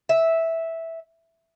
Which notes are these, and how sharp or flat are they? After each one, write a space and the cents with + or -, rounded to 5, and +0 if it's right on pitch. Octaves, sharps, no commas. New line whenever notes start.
E5 -10